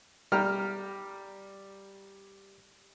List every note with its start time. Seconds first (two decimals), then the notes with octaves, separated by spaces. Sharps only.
0.32 G3 G4 A#5 F6